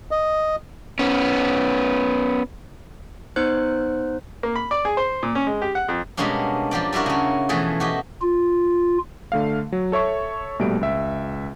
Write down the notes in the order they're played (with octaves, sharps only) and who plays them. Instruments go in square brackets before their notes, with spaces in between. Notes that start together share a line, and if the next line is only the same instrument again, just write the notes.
[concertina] D#5
[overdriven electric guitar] B3 C#4
[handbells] B3 D#4 C5 F#6
[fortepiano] A#3
B5
D5
G#4
C5
A#2
C#4
G#3
G4
F#5
F2
[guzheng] B2 G3 G#3 A#3 C#4 D4
F3 A#3 G4 D5
G3 D4 E4 F#4 A#4
C#3 C#4
B2 E3 F3 A3 G#4
F#4 G4 D#5
[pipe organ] F4
[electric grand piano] D3 A3 F5
F#3
A4 C#5 E5 C#6
A#1 B2 G3 A3 D7
C#2 E5